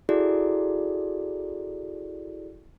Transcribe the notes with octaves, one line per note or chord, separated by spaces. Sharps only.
E4 F#4 G#4 A4 D5